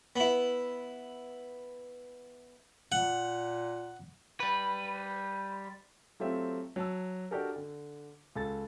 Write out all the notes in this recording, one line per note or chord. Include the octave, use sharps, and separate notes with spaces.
B3 E4
A#2 F#5
G3 B4
F#3 A3 C4 F4 G4 E5
F#3 A5 E6
D4 F#4 G4 A4 A#4
D3
C#2 A4 A6